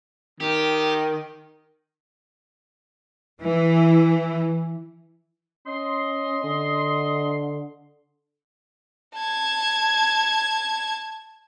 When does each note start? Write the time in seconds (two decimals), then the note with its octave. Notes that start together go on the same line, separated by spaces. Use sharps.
0.40 D#3 G4
3.42 E3
5.67 C#4 D#5 C6
6.44 D3
9.16 A5 G#6